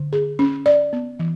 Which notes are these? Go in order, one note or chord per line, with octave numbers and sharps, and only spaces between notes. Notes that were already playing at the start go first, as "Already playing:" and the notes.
Already playing: D3
G#4
C#4
D5
B3
E3